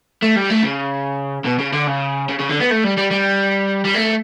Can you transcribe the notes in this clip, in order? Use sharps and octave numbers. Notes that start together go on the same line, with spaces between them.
A3
G3
A3
C#3
B2
C#3
D3
C#3
C#3
C#3
D3
B3
A3
G3
G3
G3
G3
A3